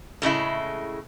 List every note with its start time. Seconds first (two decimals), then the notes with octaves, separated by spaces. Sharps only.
0.22 A2 C#3 G#3 E4